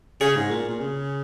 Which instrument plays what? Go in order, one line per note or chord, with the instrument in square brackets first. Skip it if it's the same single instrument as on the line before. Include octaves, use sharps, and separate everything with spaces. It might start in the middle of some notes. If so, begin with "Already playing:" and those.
[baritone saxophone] C#3 [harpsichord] G#4 C#5
[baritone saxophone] G#2
A#2
A#2
C#3